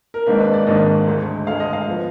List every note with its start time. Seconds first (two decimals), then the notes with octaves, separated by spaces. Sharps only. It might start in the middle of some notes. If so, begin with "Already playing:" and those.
0.14 A#4
0.26 G#1 G#2 D#3 A#3 D4 B4
0.40 B4
0.53 D5
0.66 G#1 G#2 D#3 A#3 D4 D#5
1.07 D2 D3 G#3
1.47 D2 D3 G#3 F5
1.60 D#5
1.73 F5
1.88 F3 B3